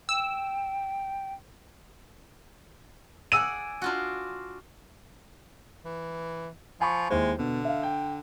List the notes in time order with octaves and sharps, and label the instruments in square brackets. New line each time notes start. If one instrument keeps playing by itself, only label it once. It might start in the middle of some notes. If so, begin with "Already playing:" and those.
[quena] G5 [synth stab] E6
[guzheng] G#4 D5 F#5 [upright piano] E6 D#7
[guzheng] D4 F4 F#4
[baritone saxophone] E3
[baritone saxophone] F3 [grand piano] G#5 B5 C#6
[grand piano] D#2 E4 C5 [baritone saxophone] G#3
[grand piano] B2 [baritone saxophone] D3
[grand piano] E5 F5
G5